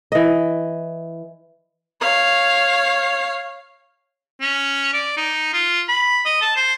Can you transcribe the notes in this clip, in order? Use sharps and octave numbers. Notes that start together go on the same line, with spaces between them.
E3 D#5
C#5 F5
C#4
D5
D#4
F4
B5
D#5
A5
C5